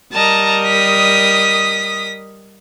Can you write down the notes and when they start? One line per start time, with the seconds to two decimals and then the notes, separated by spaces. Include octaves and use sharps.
0.13 G3 A#4 D#5 A5 A#5
0.64 D#6 B6